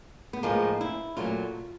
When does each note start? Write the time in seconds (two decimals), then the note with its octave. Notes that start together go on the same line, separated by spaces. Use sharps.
0.33 B3
0.43 A2 F3 G#3 A#3
0.81 E4
1.17 A#2 F#3 A3 F4